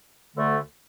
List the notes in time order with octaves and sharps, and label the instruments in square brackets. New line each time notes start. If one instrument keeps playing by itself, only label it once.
[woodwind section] D2 D3 A3